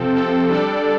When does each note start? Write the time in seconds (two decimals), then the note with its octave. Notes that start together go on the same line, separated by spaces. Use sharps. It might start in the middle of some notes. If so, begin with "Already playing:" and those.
Already playing: C3 F3 C4 A4
0.13 C3 F3 C4 A4
0.50 G3 D4 A4 D5